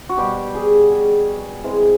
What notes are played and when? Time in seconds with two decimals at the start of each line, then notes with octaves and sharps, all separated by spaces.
0.09 F#4
0.17 B2 G3 G4
0.55 G#4
0.91 G#4
1.63 C3 E3 G#3 G#4